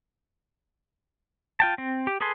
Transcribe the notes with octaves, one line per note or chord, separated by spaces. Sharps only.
F4 G5 A5
C4
G4
G#4 A4 B4 G#5 C6